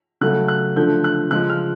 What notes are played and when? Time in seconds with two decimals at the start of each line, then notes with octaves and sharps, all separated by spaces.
0.21 C#3 F#3 A3 F#6
0.48 F#6
0.76 D3 F3 A3 G6
1.04 F#6
1.31 C#3 F3 G#3 F#6
1.49 F6